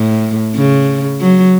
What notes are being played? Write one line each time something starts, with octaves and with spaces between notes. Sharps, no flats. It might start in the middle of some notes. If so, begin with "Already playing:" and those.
Already playing: A2
C#3
F#3